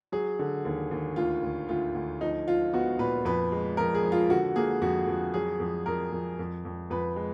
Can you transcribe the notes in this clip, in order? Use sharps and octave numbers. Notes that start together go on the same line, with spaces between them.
F#3 G#4
D3
D#2
D#2
D2 F4
D2
D2 F4
D2
F3 D#4
F3 F4
B3 F#4
A#2 B4
F2 B4
G#3
F2 A#4
G#4
F3
F4
D3 F#4
A#3 G#4
F2 F#4
F2
F#3 G#4
F2
F2 A#4
F2
F2
F2
F2 B4
G#3